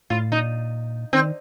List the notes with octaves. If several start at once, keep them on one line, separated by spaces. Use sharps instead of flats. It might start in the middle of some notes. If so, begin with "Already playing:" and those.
A2 F4
A#2 D#4
D#3 C4